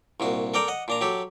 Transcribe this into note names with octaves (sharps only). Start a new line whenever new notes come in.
C2 A#2 F#4
A4 A#4 D5 G5 A#5
D#5 F#5
A#2 D4 A#5
F#3 G4 A4